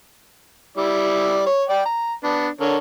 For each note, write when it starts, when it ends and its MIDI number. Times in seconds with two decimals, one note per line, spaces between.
0.77 1.45 55
0.77 1.45 64
0.77 1.45 74
1.46 1.64 73
1.69 1.82 74
1.69 1.82 79
1.85 2.14 82
2.24 2.48 59
2.24 2.48 62
2.60 2.77 50
2.60 2.77 70
2.60 2.77 73